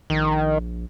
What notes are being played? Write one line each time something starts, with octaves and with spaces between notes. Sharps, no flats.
A#1 D#3